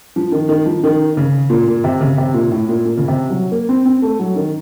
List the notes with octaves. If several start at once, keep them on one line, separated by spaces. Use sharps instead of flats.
F3
D#3
D#3
F3
D#3
C#3
A#2
A#2
C3
C#3
C3
A#2
A2
A#2
A#2
C#3
C3
F#3
A#3
C4
C4
A3
F#3
D#3